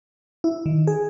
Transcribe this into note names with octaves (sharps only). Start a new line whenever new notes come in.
E4
D#3
G#4